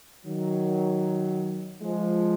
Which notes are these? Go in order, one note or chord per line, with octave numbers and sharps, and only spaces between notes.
D#3 F#3
F3 G#3